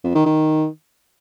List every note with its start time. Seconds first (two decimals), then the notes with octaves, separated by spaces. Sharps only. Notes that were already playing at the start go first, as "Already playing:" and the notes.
0.04 F2
0.15 D#3
0.26 D#3